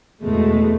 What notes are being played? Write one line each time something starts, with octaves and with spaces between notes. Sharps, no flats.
E2 B2 G#3 A3